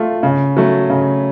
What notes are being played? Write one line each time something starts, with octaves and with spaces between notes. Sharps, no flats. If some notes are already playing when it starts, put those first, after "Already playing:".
Already playing: A3 F4
C#3
F#3 A3
C#3